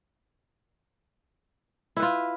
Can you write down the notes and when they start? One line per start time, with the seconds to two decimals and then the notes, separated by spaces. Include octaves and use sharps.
1.97 E4
1.99 B4
2.02 F4